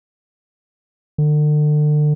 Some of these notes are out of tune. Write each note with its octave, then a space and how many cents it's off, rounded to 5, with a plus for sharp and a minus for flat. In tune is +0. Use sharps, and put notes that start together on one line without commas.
D3 +35